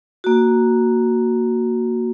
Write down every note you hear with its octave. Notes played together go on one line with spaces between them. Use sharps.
A#3 F#4